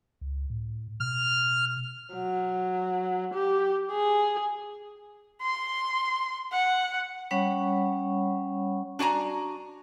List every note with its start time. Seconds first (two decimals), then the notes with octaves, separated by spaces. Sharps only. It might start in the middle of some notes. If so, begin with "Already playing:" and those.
0.21 C#2
0.50 A2
1.00 B2 F6
2.14 F#3
3.34 G4
3.91 G#4
5.42 C6
6.52 F#5
7.31 G3 C#4 C#5 F#5 B5 C#6
8.99 D4 F#4 G#5 A#5